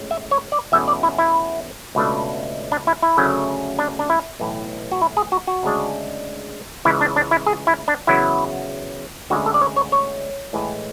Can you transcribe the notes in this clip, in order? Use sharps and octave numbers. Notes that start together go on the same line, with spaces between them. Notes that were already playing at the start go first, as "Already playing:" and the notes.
Already playing: A2 G#3 C#4
E5
C#5
D5
E2 B2 A3 C#4 E5
D5
E4
E4
C#2 B2 A3 D4
D4
E4
E4
D2 C#3 F#3 A3 C#4
D4
D4
E4
B1 A2 E3
F#4
E4
G#4
F#4
F#4
D2 C#3 G#3 D4
C#2 C#3 E3 E4
D4
D4
E4
G#4
E4
D4
E2 C#3 F#3 B3 E4
D2 D3 G#3 C#4 F#4
A4
D5
C#5
C#5
C#5
A2 E3 G#3